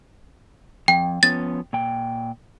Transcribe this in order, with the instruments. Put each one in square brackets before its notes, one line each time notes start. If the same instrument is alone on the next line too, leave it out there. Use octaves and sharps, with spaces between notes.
[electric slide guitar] F2 [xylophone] G5
[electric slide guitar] F3 B3 C#4 [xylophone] A6
[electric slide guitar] A#2 G5